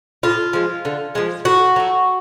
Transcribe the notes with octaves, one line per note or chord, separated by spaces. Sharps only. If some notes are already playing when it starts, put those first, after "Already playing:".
A2 F4
F3 G#3
D3
F3 G#3
A2 F#4
F#3 A3